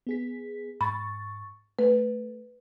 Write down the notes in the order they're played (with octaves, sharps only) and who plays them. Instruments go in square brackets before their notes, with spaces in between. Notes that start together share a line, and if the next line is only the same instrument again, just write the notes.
[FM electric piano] B3 G#4 B6
[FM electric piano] G#2 C#6 A6 [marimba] B5
[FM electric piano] A3 [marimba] B4